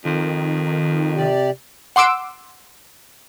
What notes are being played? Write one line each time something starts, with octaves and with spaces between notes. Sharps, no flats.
F2 D#3
C3 G4 D5
F#5 C6 D6 E6 D7